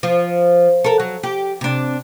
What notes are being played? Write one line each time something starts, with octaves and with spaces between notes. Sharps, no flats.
F3
A4 A#4
F#3
G4
C3 D4